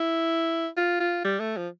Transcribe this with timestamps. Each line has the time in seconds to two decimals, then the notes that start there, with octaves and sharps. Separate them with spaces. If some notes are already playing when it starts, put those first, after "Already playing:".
Already playing: E4
0.77 F4
1.00 F4
1.24 G3
1.40 A3
1.57 F3